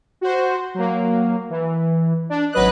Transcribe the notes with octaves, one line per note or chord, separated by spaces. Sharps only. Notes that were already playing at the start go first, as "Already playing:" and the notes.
F#4 C5
F#3 A#3
E3
D4
G#1 F#3 B4 D#5 F#6